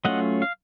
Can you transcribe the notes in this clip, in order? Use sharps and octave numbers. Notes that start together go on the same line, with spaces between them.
F#3 A3 C#4 F4 D#5 F#5
F5